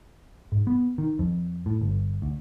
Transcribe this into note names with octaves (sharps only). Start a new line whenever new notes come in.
G#2
B3
D#3
F2
A2
G1
D2